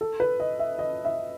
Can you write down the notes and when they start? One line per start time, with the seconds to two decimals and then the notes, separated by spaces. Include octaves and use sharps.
0.01 A4
0.20 B4
0.40 D#5
0.59 E5
0.79 D#5
1.05 E5